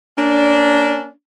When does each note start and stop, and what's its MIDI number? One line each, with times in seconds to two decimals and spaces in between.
0.18 1.09 58
0.18 1.09 61
0.18 1.09 62